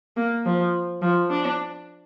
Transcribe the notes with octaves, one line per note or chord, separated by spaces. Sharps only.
A#3
F3
F3
D4